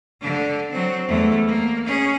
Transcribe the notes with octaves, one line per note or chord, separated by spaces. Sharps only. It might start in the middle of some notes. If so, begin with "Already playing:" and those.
D3 D4
F#3 C4
E2 A3
A#3
C#4 G#4